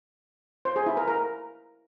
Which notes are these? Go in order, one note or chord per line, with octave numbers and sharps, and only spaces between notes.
C5
G#4
E4
A#4
A#4